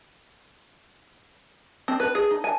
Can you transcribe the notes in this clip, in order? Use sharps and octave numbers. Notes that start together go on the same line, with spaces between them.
C4
B4
G#4
D#4
G#5